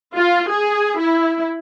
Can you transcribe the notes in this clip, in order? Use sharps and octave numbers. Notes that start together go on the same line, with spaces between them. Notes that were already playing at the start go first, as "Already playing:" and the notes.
F4
G#4
E4